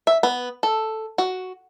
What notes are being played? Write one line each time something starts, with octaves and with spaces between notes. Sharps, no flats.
E5
B3
A4
F#4